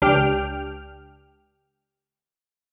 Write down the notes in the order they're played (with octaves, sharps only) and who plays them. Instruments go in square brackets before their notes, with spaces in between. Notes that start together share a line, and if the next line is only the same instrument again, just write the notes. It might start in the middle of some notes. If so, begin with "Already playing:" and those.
[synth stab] C#2 D4 G4 G5 F6